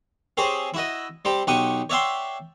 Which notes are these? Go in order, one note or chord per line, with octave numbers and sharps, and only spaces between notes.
C4 G4 G#4 C5 C#5
E4 F#4 D#5
G3 C4 G4
B1 G4 F#5 G5 C#6 D#6
C#5 D5 E5 F#5 G5 C6